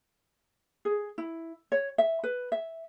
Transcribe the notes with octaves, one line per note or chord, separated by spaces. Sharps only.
G#4
E4
C#5
E5
B4
E5